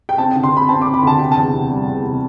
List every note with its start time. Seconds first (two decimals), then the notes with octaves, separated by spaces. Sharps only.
0.09 G5
0.18 C4 A5
0.31 D3 G5
0.43 C6
0.52 C4 B5
0.69 C4 A5
0.82 C4 D6
0.94 B5
1.02 D2 A5
1.19 C3 G5
1.32 E2 A5
1.54 C3
1.70 G3
1.87 E2
2.03 C3